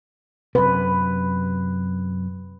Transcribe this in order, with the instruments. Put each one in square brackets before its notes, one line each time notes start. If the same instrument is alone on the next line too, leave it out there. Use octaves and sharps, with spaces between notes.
[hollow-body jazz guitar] F#2 C3 [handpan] B4